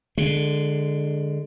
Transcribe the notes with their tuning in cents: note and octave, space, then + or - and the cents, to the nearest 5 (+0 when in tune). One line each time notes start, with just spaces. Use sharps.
D3 +10 G#3 +0